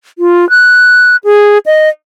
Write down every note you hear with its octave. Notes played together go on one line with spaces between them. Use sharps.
F4
F#6
G#4
D#5